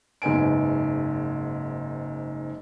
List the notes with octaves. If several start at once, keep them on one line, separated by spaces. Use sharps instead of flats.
F#1 G#2 B4 G#5 D7